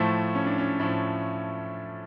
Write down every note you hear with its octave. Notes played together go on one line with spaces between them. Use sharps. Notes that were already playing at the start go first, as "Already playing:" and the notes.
Already playing: A2 F3 A3
C#4
D4
C#4
A2 F3 D4